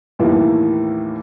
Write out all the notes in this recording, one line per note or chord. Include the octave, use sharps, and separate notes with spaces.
D#2 A2 D#3 E3 A#3 B3